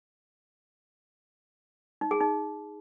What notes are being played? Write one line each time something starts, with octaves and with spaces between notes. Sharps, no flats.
D#4
G#4
D#4